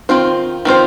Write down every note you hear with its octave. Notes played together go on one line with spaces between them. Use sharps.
D#3 C4 F4 C5
D#3 C4 F4 C5